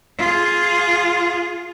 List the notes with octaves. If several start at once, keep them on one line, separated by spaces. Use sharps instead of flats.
F4 G#4